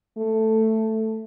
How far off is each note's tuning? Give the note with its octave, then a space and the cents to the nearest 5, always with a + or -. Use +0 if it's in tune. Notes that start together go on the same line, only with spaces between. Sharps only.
A3 +5